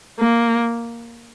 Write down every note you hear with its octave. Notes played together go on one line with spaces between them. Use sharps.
A#3